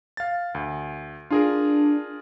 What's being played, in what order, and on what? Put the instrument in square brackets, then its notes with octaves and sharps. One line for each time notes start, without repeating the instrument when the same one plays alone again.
[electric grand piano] F5 A6
D2
[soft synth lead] D4 [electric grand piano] F4 G#4 A#4